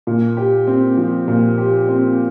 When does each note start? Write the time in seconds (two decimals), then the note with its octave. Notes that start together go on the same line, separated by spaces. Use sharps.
0.07 A#2
0.37 G4
0.67 C4
0.97 F3
1.28 A#2
1.58 G4
1.89 C4